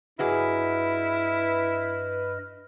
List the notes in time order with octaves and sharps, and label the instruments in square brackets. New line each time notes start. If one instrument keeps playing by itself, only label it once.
[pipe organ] G2 D#5 F6 [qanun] F#3 G#4 D6 [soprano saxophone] E4 [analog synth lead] B4